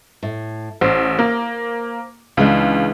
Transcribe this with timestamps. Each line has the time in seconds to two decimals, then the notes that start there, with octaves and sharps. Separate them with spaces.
0.23 A2
0.81 A1 C5
1.19 A#3
2.37 C#2 E3 G#3 D4